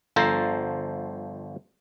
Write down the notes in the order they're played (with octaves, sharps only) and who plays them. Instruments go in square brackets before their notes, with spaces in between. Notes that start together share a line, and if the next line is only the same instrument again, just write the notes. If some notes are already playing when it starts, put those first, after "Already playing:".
[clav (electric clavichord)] G1 F3 A4 C5 A5 A#5